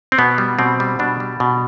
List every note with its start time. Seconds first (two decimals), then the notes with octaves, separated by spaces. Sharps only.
0.12 C4
0.18 B2 B3
0.38 G3
0.59 B2 C4
0.80 G3
0.99 B2 D4
1.20 G3
1.40 B2